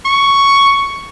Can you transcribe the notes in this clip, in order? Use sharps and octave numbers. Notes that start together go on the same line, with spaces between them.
C#6